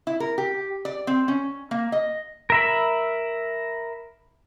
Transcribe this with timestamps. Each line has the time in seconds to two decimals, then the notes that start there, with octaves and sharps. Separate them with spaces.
0.07 E4
0.20 A#4
0.38 G4
0.85 D5
1.07 C4
1.28 C#4
1.71 A#3
1.92 D#5
2.50 A#4 E5 B5